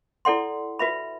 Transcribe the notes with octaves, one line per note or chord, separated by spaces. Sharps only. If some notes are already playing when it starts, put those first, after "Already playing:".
E4 A4 D5 F#5 C6
F#4 B4 E5 B5